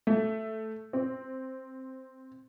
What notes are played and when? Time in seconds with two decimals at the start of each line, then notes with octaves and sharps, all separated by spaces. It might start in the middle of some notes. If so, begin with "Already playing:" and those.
0.07 A3
0.93 C4